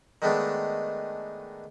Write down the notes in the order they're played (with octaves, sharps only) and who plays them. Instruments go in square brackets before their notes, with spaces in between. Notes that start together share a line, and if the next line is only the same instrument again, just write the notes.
[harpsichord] D#3 G#3 A3 B3 D4